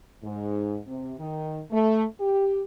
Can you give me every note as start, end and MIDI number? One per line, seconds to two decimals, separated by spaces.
0.23 0.78 44
0.86 1.13 48
1.18 1.60 51
1.71 2.03 57
2.20 2.63 67